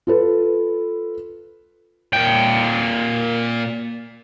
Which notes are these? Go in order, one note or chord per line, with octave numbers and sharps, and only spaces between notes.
F4 A4 B4
A#2 G5